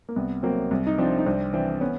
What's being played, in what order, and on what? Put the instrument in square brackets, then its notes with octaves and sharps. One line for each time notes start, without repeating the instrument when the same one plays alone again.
[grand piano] A#3
C2 B3
F#3 A#3 C4
C2
D#4
F3 C4 D4
D#4
C2 C4 D4
E3 C4 D4
B3 C#4